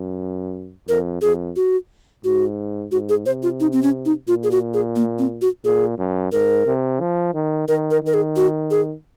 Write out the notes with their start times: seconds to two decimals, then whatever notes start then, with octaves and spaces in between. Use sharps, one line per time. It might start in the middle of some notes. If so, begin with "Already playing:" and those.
Already playing: F#2
0.88 F2 A#4
1.22 F2 G#4
1.56 F#4
2.24 G#2 F#4
2.92 G#2 F#4
3.09 G#4
3.26 C3 C5
3.43 F4
3.60 D#4
3.72 C4
3.83 C#4
4.05 D#4
4.28 A#2 F4
4.43 G#4
4.51 F#4
4.74 G#4
4.96 A#3
5.19 C4
5.41 F#4
5.64 A#2 G#4
5.98 F#2
6.32 G#2 A#4
6.66 C3
7.00 F3
7.34 D#3
7.68 D#3 A#4
7.91 A#4
8.02 D#3 A#4
8.14 G#4
8.36 F#4
8.71 G#4